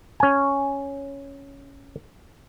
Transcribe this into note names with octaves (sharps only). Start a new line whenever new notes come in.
C#4 G#5